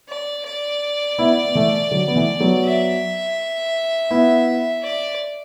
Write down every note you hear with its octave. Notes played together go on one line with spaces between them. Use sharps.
D5
D5
B3 E4
B3
E3 A3
D3 F#3
B3
E3 A3
F#3 B3
E5
B3 E4
D5